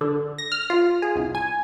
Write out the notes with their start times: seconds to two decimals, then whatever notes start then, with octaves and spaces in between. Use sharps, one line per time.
0.01 D3
0.38 A#6
0.52 F6
0.70 F4
1.02 G#4
1.16 C2
1.35 G#5